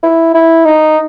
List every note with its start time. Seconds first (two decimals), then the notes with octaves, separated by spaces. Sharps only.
0.03 E4
0.34 E4
0.65 D#4